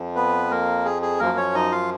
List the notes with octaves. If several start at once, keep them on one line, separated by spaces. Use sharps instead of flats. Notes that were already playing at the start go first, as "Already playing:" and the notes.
Already playing: F2 F3
B3 B4
A#3 A#4
G#4
G#4
F#2 F3 A#3 A#4
C#4 C#5
D#4 D#5
F4 F5